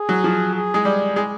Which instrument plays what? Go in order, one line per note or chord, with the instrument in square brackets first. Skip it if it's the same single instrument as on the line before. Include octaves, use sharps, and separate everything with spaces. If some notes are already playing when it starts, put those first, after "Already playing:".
Already playing: [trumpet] G#4
[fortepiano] F#3
F3
[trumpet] G#4
[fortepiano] G#3
G3
G#3